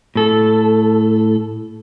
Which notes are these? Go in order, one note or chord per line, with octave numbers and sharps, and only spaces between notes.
A2 A4